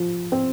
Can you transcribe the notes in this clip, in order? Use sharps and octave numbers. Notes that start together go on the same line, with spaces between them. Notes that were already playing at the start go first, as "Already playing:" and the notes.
Already playing: F3
C4